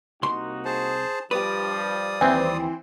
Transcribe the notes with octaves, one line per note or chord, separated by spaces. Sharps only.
C2 A#3 D#4 F#4 C6
G#4 C5 A5
G2 F3 G3 G4 B4 D5 D#6
D#2 E3 C4